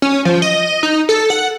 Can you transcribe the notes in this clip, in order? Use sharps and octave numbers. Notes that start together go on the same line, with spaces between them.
C#4
F3
D#5
D#4
A4
F#5